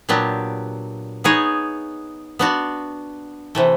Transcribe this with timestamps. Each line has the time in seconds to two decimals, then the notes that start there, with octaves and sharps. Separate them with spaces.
0.09 A#2 F#3 B3 D4 G4
1.24 B3 D#4 G#4 C#5
2.39 B3 D4 F#4
3.55 C3 E3 A3